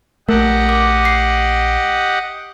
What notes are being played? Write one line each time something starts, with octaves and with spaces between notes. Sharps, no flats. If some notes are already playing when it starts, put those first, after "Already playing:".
A#1 A3 G4 A#4 D#5 F#5
D6
C7